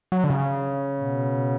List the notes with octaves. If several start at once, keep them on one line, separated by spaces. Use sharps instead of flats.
F#3
D3
C#3
B2